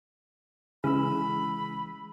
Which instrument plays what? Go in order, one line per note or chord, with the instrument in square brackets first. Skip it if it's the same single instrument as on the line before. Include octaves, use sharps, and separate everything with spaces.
[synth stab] C#3 [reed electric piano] E3 G#3 E6 [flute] B5